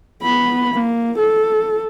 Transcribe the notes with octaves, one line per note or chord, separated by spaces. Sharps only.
B3 B5
A#3
A4